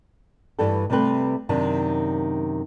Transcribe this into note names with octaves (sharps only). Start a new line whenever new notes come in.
G2 E3 G3 A4
C3 G3 A3 C4 B4
F#2 C3 D#3 D4